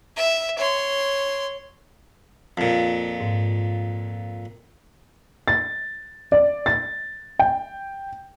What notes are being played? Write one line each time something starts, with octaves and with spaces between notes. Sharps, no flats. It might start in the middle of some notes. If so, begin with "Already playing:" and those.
E5
C#5 C6
F2 A#2
G#2
A6
D5
A6
G5